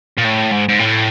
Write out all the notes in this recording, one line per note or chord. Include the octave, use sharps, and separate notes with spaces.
A#2
A2
G#2
G#2
A2